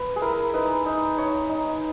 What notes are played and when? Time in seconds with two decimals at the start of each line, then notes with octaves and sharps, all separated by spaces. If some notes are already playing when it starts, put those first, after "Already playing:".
Already playing: B4
0.16 G#4
0.21 E4 A#4
0.53 D#4 B4
0.86 D#4
1.17 D#4 C#5
1.49 D#4